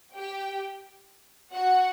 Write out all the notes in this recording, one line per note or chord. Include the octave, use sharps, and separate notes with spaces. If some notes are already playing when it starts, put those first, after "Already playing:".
G4 G5
F#4 F#5